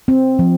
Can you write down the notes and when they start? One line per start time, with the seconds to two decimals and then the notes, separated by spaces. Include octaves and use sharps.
0.08 C4
0.39 F3